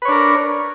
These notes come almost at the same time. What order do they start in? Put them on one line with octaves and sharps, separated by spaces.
B4 C#5 D4 A#4